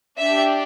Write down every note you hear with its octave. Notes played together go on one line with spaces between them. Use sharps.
D4 G4 E5